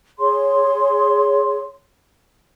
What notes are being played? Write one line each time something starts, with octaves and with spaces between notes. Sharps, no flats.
G#4 C#5 C6